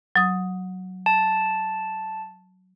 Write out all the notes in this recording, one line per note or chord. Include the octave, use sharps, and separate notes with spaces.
F#3 D#6
A5